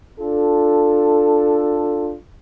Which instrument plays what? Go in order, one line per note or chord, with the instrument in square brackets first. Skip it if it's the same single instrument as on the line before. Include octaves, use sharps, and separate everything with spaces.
[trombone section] D4 F4 A4